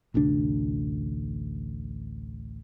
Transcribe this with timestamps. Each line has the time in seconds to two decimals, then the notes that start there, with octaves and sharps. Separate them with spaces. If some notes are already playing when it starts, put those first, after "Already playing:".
0.14 A1 D2 C3 D4